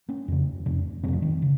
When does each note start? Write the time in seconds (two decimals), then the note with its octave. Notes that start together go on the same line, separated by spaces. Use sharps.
0.09 A#3 C#4
0.28 F2 C#3
0.66 F2 C3
1.03 F2 G#3 C4
1.08 C3
1.13 F3
1.22 D#3
1.42 C#3